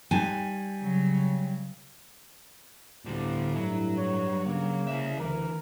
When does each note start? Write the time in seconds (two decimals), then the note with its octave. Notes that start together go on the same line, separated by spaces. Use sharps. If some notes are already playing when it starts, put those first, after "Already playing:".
0.11 G3 D#4 G#5 A5
0.81 C#3 F#3
3.05 D2 A2 D3 G3
3.55 G2 F#3 E4
3.97 C#5
4.45 C#3 A#3
4.87 C2 E5
5.18 D2 E3 A#4